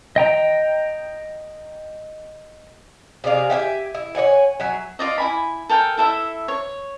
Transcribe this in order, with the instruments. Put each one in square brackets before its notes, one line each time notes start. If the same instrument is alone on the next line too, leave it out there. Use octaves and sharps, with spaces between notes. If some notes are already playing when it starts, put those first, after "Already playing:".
[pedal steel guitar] D#5 G5 A#5
[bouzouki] C3 G#4 D5 F5
G4 E5 G5 G#5
E4
C#5 D#5 F#5 G#5
F#3 E5 G#5
[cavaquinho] F4 D5 D#5
E4 G#5 B5
A4 A#4 G5 G#5
E4 A4 E5
C#5